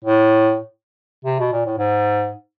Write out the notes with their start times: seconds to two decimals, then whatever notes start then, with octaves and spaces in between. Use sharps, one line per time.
0.04 A2
1.25 C3
1.39 B2
1.52 A#2
1.66 A2
1.78 G#2